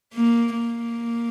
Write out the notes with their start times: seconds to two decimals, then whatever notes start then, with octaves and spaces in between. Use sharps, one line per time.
0.15 A#3
0.60 A#3